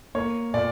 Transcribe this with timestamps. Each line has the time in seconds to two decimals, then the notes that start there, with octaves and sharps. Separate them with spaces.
0.15 A#3 C#5
0.54 A#2 D5